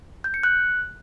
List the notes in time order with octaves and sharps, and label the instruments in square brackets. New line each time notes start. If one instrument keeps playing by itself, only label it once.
[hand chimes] G6
C#7
F#6